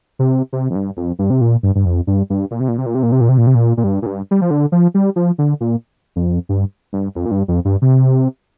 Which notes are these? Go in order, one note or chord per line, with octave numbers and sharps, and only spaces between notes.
C3
C3
F2
G2
F2
G2
C3
A#2
G2
G2
F2
G2
G2
A#2
C3
A#2
C3
A#2
C3
A#2
C3
A#2
C3
A#2
C3
A#2
A#2
G2
A#2
G2
G3
F3
D3
F3
G3
F3
D3
A#2
F2
G2
G2
F2
A#2
G2
F2
G2
C3